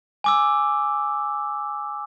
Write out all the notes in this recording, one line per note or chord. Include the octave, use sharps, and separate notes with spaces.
G#5 D6 E6